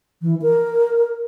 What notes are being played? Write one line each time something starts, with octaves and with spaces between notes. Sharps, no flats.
E3
A#4